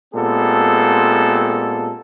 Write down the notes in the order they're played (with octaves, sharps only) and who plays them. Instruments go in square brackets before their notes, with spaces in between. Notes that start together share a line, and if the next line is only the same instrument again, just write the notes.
[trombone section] A#2 G#3 B3 C4 G4 A4